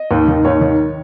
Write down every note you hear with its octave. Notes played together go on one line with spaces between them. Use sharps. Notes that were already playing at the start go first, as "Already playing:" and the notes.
Already playing: D#5
D#2
D#3
D#2 C#5
D#3